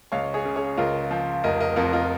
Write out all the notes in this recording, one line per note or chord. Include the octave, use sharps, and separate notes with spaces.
C#2 C#5 F5
G#4 C#5
C#3
G#4 C#5
C#2 F4 A#4
F3
F1 A#4 D#5
A#4 D#5
F2 F4 A#4
F4 A#4